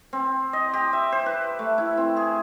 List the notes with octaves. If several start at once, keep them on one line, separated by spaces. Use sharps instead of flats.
C4
D#5
G4
E5
C5
B4
A3
E4
C4
G#4